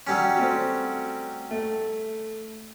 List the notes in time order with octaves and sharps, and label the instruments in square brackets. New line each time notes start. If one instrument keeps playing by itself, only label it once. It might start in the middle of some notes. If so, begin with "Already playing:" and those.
[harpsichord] F#3 G3 C#4
[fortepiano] A3 C4 F#4
A3